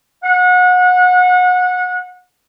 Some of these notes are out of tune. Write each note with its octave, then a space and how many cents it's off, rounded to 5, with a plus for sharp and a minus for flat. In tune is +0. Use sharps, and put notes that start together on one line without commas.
F#5 -30